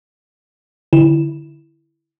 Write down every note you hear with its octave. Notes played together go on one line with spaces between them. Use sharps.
D3 E4 E7